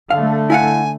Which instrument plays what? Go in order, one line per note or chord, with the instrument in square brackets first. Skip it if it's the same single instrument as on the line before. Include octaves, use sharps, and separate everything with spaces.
[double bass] D3 A3 [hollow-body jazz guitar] F5
[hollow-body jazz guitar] E4 F5 F#5 [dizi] G#5